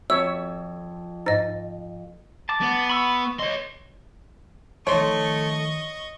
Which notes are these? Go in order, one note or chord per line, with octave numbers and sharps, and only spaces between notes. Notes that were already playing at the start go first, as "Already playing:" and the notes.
F2 C#5 E5 E6
G#2 D#5 A6
A5 D6
B3
B5 C#6 E6
C#5 D#5 C6
F2 D#3 A3 C#5 D#5 C6 C#6